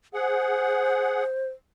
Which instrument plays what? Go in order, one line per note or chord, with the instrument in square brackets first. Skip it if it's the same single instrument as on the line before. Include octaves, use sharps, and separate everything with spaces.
[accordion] G#4 F#5 [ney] C5